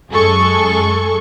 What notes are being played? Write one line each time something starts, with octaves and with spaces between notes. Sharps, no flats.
F#2 G#3 G#4 A4 C#6